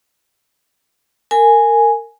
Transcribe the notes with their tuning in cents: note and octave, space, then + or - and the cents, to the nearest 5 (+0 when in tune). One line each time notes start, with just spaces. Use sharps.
A#4 -25 G#5 +0